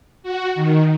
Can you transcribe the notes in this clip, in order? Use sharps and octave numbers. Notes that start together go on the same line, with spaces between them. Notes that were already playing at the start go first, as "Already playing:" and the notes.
F#4
D#3